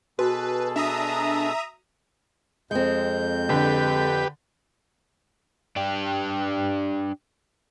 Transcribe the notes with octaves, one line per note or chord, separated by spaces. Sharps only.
B2 F#4 G#4 A4 B4
D4 E5 A#5 D#6
F2 G#3 C4 G6
D3 G4 B4
D4 G4